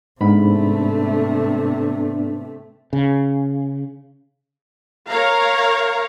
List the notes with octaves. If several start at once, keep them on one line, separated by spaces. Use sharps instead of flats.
G#2 C3 A3 B3 D4 B5
C#3
A#4 C#5 F5 A#5